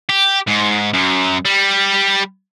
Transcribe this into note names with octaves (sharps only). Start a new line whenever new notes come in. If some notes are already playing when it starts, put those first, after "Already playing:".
G4
G#2
F#2
G3